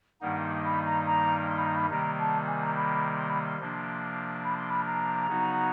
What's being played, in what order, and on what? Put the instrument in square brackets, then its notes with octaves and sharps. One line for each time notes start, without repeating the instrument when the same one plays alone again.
[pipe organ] G2 D#3 G3 A#3 D#4 [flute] F#5
[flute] C6
B5
A#5
A#5
C6
B5
A#5
B5
[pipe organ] C3 D#3 G3 A#3 [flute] A#5
[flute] A5
G#5
A#5
B5
C6
B5
C6
[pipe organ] C3 F3 A#3 D4
[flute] B5
C6
B5
A#5
[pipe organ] C#3 F#3 B3 D#4 F#4